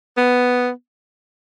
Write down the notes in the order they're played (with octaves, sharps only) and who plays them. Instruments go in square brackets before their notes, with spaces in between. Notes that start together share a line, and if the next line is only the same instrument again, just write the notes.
[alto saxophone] B3